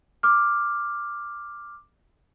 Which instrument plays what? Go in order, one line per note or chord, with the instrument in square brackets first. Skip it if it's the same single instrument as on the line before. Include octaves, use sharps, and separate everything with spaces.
[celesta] D6 F6